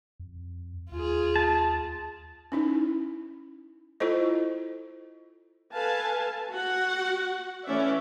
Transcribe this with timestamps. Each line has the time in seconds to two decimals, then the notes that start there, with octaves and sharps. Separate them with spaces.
0.20 F2
0.92 D#2 F4 G#4
1.36 A5
2.52 C#4 D#4 E4
4.00 E4 F4 A4 C5 D#5
5.75 A4 B4 F5 G#5 A5
6.50 F#4 F#5
7.65 E3 A3 C#4 D5 E5